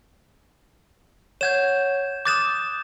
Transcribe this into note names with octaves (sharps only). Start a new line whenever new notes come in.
C#5 F#5 G6 G#6 E7
D6 D#6 F#6 G6 A6 E7